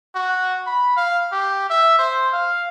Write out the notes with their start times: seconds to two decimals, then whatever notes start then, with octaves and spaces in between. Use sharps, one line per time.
0.15 F#4
0.67 B5
0.97 F5
1.32 G4
1.70 E5
1.99 C5
2.33 F5